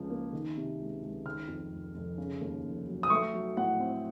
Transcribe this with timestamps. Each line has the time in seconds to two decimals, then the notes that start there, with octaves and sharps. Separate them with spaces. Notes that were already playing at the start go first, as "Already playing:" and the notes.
Already playing: C#2 C#3 F3
0.10 A#3
0.33 D#3
0.57 C3
0.80 C#2
1.02 C#2
1.25 D#3 F6
1.48 F2
1.72 F1
1.94 F1
2.18 C#3
2.41 D#2
2.65 F1
2.88 F#3
3.03 D#6
3.10 A3 C#6
3.34 F#3
3.57 A2 F#5
3.80 C4